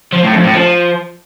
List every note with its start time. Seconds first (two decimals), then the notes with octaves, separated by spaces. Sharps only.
0.13 F3
0.23 A2
0.34 F2
0.44 A2
0.55 F3